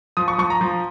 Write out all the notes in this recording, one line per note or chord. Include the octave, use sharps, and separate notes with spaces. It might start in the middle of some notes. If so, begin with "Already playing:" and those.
F3 D#6
C#6
F3 C#6
A#5
F3